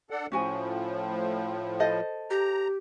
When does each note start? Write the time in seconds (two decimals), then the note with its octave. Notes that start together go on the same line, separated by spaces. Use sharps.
0.10 D4 A4 F#5
0.32 A2 F3 C#4 F#4 G#5
1.80 A4 C5 D#5
2.30 G4 A#5